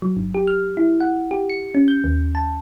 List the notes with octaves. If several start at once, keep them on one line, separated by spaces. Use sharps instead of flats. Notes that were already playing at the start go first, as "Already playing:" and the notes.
F#3
G1
G4
F6
E4
F#5
G4
C#7
C#4
G6
D#2
A5